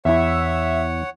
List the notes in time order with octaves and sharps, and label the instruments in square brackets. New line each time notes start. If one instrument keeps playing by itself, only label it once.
[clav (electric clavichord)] E2 E4 [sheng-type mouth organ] C#5 F#5 [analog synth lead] E5